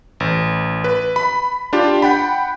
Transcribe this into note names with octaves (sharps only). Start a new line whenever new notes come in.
A1
B4
B5
D4 F4 G4
F#5 G5 B5